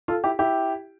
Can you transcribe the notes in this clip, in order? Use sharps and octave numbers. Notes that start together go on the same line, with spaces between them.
F4 A4
E4 G4
E4 G4